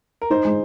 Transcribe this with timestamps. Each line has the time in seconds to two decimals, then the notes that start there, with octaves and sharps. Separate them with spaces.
0.22 A#4
0.30 D#4 C5
0.45 G#3